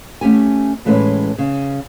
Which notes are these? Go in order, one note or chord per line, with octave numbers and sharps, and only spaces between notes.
A3 C#4 G4 G#5
A2 E3 G#3 C#4 B4
C#3